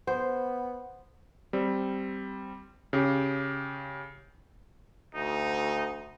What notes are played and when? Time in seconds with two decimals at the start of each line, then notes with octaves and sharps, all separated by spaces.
0.07 B3 C5
1.53 G3 C4
2.93 C#3 G4
5.15 D2 D#4